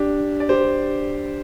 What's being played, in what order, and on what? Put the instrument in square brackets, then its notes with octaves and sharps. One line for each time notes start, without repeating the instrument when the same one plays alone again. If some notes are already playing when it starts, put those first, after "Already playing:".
Already playing: [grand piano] D4 G4
D5
G4 C5